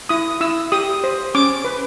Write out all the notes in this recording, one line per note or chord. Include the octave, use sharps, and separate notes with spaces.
E4 D#6
E4 E6
G4 D#6
C5
C#4 D6
B4